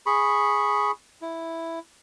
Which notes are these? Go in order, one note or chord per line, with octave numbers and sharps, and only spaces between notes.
G#4 B5 C#6
E4